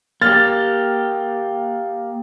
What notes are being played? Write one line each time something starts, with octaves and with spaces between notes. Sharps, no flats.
A#3 G4 F6 A6